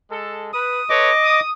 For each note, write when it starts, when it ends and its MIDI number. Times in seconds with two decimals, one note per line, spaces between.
0.11 0.48 56
0.11 0.48 69
0.53 0.82 71
0.53 0.89 87
0.89 1.10 69
0.89 1.10 71
0.89 1.10 73
0.89 1.40 75
0.89 1.40 86
1.24 1.51 87